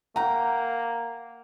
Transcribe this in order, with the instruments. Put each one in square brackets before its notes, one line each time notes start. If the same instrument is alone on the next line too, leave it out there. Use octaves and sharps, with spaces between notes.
[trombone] A#3 [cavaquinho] F#5 G5 [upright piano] A#5